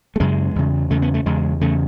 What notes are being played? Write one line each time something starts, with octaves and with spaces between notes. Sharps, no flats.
A3
F#2 C#3 G#3
E2 C#3
E2 C#3 A3
B3
A3
E2 C#3 G#3
E2 C#3 A3